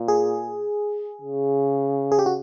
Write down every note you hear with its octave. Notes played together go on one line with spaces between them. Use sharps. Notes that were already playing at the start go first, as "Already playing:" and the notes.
Already playing: A#2
G#4
C#3
G#4
G4
F#4